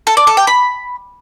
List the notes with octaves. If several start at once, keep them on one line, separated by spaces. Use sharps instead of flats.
A4
D5
A4
G5
B5